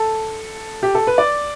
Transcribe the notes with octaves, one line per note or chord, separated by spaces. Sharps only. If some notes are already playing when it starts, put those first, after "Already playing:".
Already playing: A4
G4
A4
B4
D5